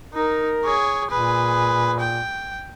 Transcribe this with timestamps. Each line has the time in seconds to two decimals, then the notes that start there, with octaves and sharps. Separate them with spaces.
0.14 D#4 A#4
0.65 G#4 C#5
1.10 A#2 G#4 B4
2.00 G5